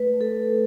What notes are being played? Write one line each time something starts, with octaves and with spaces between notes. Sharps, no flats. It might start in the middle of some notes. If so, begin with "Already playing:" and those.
Already playing: A3 B4
A3
A4